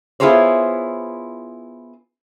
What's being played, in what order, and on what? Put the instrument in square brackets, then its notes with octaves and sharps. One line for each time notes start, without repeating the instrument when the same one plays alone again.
[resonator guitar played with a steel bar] B3 E4 F4 G#4 C5 C#5